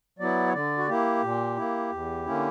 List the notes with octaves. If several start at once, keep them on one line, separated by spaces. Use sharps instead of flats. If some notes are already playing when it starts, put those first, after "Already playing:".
F#3 B3 E4 D5
C#5
D3 D5
F#4
A#3 E4 G4
A#2
A#3 E4
E2
D3 A#3 C#4 E4